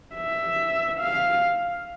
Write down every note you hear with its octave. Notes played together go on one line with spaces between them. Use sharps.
E5
F5